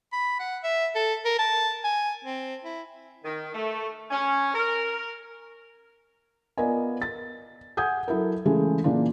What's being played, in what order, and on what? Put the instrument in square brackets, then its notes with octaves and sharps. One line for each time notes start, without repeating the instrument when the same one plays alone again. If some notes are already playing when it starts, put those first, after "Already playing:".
[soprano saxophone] B5
F#5
E5
A4
A#4
A5
G#5
C4
E4
[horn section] D#3
A3
C#4
A#4
[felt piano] B3 F4 A#4 D5 D#5 G#5
A6
F#5 G#5 D#6 G6 G#6
F#3 E4 A4 A#4
C#3 E3 G#3 A3
A#2 C#3 E3 A#3 D4 F4